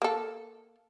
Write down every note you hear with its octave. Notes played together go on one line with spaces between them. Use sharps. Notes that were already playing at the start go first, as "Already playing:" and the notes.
A#3 A4